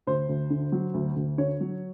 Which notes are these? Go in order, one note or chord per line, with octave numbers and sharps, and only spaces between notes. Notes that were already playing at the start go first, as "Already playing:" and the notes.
D2 C5
D2
D3
F#3
D2
D2
D3 C#5
F#3